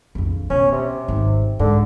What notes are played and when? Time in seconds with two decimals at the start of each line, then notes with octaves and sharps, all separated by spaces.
0.15 A#1 F2
0.50 B2 C#4
0.72 C3
1.08 G#1
1.59 G#2 D3